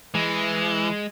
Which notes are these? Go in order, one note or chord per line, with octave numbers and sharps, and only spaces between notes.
E3 G#3